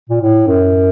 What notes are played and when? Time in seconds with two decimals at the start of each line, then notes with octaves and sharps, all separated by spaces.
0.09 A#2
0.21 A2
0.47 F#2